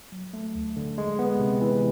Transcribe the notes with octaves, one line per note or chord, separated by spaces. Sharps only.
F#3
A3
D2
D3
G#3
B3
C3
E3